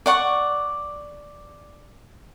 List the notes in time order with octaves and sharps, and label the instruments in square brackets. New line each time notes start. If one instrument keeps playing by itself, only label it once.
[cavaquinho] D5 F#5 C#6